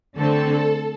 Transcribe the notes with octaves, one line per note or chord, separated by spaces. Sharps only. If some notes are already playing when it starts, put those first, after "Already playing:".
D3 A3 C4 A4